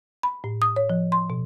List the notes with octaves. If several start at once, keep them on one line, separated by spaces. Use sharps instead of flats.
B5
A2
D#6
C#5
F3
C6
B2